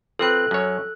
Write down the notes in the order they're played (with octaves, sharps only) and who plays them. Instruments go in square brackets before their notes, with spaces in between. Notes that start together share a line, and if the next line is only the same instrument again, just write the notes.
[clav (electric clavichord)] F3 C4 B4 [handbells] A4 F#6
[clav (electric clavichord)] F#2 C#5